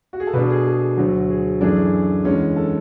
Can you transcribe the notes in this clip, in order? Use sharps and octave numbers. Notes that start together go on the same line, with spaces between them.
F#4
G#4
A4
B2 A3 D4 B4
G#4
G#4
D2 D3 F#3
G#4
F#2 E3 A3 D4 G#4
E2 D3 G#3 C#4
A4